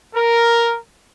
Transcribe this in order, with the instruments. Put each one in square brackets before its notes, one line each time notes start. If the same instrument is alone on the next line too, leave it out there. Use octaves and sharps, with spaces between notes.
[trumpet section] A#4